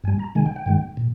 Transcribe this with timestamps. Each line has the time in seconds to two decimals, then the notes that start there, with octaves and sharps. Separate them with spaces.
0.04 G2 G#5
0.08 G3
0.19 A#5
0.35 C3 D#3 G#3 G#5
0.46 G5
0.56 G5
0.66 G2 D#3 G#3
0.97 A#2